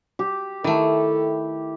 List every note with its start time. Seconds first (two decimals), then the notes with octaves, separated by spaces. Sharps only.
0.19 G4
0.64 D#3 A3 E4 A4